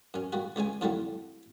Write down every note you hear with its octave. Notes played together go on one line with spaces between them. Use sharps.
F#2 C#4
A#2 G3 F#4
C#2 C#3 G#3 G#5
F2 A2 D3 D#3 F#3 G3